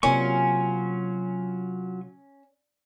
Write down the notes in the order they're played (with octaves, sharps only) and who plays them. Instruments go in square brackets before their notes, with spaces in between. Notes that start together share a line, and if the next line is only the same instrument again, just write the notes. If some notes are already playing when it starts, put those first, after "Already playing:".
[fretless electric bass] C3 A#3 [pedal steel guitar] F#3 F4 C#6 [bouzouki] C#4